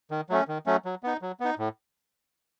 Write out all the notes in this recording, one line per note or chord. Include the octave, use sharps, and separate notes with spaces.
D#3
F#3 A3 C#4
D#3
F#3 A3 C#4
F#3
B3 D#4
F#3
B3 D#4
A2